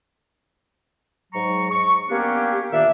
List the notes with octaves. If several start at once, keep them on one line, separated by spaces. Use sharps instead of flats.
G#2 F#3 A#5 C#6
C#6
A#3 B3 C#4 D4 G4
A#2 D#3 D4 E5